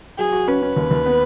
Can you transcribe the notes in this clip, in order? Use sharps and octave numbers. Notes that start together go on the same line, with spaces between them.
F#3 G#4
F#4
C#4 B4
C#4
D#2
D#2
B3